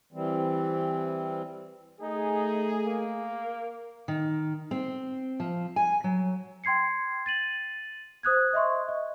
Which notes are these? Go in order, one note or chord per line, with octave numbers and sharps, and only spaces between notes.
E3 G3 C4
A3 D#4 G#4
A#3
D#3
C4
F3
G#5
F#3
G5 C6 G#6 C7 C#7
A6 D#7 F#7
C5 D#6 F#6 G#6
D#5 E5 C6 C#6
D#5